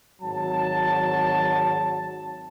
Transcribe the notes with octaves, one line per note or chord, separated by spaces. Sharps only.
G#1 F#3 A5